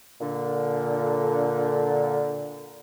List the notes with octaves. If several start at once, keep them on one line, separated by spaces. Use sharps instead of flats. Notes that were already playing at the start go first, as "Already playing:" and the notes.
A#2 D3